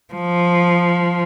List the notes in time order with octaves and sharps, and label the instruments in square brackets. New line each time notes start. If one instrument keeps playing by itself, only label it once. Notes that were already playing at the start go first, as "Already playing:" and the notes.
[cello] F3